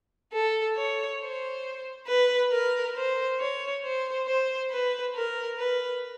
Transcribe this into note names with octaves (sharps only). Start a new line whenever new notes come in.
A4
C#5
C5
B4
A#4
C5
C#5
C5
C5
B4
A#4
B4